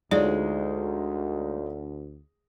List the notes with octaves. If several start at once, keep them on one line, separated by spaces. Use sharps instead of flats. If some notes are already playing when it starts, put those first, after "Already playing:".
D2 G#3 D#4 F4 C#5 D5